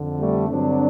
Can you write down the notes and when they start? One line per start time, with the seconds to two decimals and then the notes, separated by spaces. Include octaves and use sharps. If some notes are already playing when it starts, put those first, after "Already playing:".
Already playing: F2 D3
0.19 G3 A3
0.49 G2 D3 F#3 C4 D4